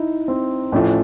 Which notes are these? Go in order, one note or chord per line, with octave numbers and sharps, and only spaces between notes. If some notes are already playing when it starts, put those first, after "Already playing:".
Already playing: D#4 E4
C4
A1 A2 F3 A3 C#4